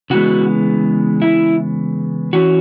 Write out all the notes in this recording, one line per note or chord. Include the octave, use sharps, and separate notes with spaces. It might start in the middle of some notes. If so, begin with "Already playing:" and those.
C#3 E3 G#3 B3 F#4
E4
E3 C#4 F#4